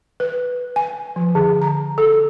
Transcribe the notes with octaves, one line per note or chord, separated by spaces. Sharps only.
B4
G#5
F3
D3
A#5
A4